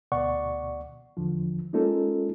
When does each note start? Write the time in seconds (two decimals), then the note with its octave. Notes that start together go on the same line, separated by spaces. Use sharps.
0.12 D2 B2 D5 F#5 C#6
1.17 E2 D3 F3
1.73 G#3 A#3 C#4 D#4 F4 A4